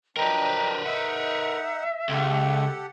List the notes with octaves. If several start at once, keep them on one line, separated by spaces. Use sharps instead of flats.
F3 F#3 D4 A#4 B4 D#5 G5 A#5
D#4 E5 F#5
C#2 G4 A4 F#5